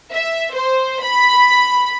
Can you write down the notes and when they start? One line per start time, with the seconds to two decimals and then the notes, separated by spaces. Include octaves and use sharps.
0.14 E5
0.54 C5
1.02 B5